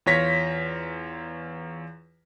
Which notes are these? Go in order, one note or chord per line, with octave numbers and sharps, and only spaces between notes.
E2 F4 C#5 A#6 B6